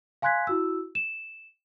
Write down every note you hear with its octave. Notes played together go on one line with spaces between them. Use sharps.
F5 G#5 C6 F#6 G#6 B6
E4 F#4 E6
E7